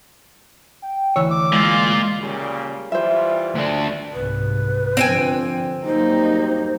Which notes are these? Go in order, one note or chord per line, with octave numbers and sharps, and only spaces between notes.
G5
D2 E3 C#5 E6
D6
A#2 G#3 F4
A#2 C#3 G3
E3 G3 F4 C5 E5
D2 D4
C2 G#2 C3 B4
G2 D3 F3 C4 G5 G#5
F#3 G3 A#3 D#4 C5